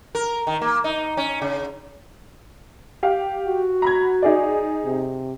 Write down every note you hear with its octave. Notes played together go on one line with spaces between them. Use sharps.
A#4
D#3
A#3
D#4
C#4
C#3
G4 F5
F#4
A#5 B5 G#6
D#4 G#4 D5
C3